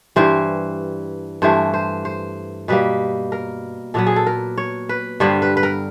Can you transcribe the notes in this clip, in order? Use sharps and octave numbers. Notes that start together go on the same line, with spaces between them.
G2 E3 G3 C5
G2 E3 A3 C5
C5
C5
B2 G3 A#3 B4
A#4
A#2 F#3 B3 A4
G#4
A4
A#4
C#5
B4
G2 D3 G3 B3 C5
B4
B4
A#4